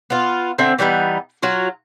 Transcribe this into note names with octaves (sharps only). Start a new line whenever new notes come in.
B3 F4
D3 C4 E5
E3 G3 B3 D#4
F#3 F4 F#4